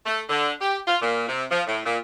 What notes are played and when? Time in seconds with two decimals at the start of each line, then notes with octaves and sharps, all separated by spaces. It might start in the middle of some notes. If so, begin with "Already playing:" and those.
0.06 A3
0.29 D3
0.61 G4
0.87 F4
1.01 A#2
1.28 C3
1.49 F3
1.66 A2
1.85 A#2